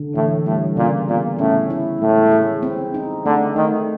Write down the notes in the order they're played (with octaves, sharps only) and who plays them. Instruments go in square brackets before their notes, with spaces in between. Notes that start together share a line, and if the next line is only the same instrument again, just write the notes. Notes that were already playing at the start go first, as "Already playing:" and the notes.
Already playing: [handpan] D3
[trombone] A2 [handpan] E3
[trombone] A2 [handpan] G3
[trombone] A#2 [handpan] C#3
[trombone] A#2 [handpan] B3
[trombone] A2 [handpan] C#4
[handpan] E4
[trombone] A2 [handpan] G#3
[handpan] G#4
C4
D#4
[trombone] D3 [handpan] A3
[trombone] D#3 [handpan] A3